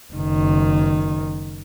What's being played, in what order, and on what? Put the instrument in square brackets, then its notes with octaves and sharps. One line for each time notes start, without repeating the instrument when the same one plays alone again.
[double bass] F#1 D#3